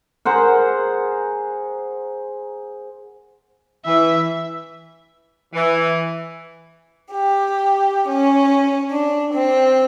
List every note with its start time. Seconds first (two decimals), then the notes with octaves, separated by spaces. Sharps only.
0.25 G#4 A#4 C5 F#5
3.85 E3 E5
5.54 E3
7.12 G4
8.08 C#4
8.90 D4
9.34 C4